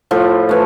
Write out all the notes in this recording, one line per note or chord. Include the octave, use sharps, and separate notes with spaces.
A2 F3 F4
E3 A3